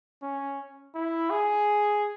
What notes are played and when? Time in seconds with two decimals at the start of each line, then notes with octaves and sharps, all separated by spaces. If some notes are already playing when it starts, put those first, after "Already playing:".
0.22 C#4
0.95 E4
1.30 G#4